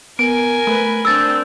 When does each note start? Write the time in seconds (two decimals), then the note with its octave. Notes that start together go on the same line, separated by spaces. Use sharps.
0.19 B3 A#4 G#5 D7
0.67 A3 B4
1.05 C4 D4 E6 A6